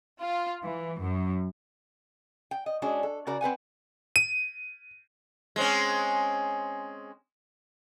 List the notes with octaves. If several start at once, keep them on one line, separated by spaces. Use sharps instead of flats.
F4
E3
F#2
G5
D#5
G#3 C#4 D4 F#4
A4
C#3 F#4 A#4 D5
C4 B4 F#5 G#5
D#7
G#3 C4 C#4